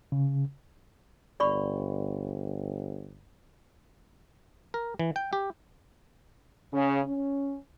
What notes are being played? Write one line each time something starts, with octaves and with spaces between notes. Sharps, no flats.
C#3
G1 D5 B5 C#6
A#4
E3
G5
G4
C#3
C#4